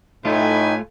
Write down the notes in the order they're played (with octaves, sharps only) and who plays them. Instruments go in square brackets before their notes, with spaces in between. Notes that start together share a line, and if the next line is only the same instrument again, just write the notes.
[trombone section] A2 [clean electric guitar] A3 F4 [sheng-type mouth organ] D#4 [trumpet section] G4 B4 G#5